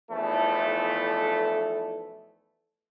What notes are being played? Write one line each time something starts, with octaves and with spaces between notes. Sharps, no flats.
B1 E2 F3 A3 E4 A4